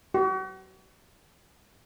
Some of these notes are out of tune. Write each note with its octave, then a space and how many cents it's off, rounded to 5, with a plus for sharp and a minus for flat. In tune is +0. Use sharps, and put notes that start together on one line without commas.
F#4 +40